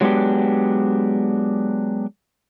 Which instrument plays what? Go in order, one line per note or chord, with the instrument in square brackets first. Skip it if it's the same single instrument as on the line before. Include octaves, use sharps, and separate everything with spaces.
[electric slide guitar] F#3 G#3 A3 B3 D4 G4